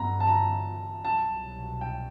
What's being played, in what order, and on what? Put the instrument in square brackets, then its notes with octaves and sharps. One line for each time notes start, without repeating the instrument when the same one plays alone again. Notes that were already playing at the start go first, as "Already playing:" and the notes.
Already playing: [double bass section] G2 D3 F#3 B3 [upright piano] A#5
[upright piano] A5
A#5
[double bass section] C2 B2 F#3 [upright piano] A5
[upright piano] G5